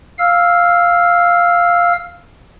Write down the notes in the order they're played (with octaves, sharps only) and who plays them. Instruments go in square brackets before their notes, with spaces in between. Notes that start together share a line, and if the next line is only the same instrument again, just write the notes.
[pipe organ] F5 E6 F6